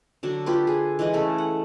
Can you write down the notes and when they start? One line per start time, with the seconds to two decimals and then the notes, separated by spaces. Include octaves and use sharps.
0.23 D3 F#3 D4
0.46 F4 G4 B4
0.67 G#4
0.99 E3 G#3 B4 D#5
1.13 C#3 A3 A4
1.38 F#5